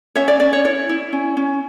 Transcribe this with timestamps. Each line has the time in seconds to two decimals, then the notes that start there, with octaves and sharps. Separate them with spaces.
0.15 C#4 C#5 E5
0.28 D5
0.40 C#4 D5
0.53 C#5
0.65 E4 C#5
0.89 E4
1.13 C#4
1.37 C#4